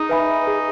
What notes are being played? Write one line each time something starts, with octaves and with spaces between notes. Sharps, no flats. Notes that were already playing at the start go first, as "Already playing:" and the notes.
Already playing: D#4 G#4
B4 E5 G#5 B5
G#4